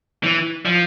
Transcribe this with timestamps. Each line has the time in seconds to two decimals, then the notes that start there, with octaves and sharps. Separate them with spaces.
0.23 E3
0.65 F3